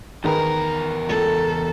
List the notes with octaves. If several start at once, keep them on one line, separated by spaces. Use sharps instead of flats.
E2 D#3 G#4 A#4 B4
C#2 A4